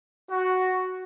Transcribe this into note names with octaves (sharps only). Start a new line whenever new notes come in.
F#4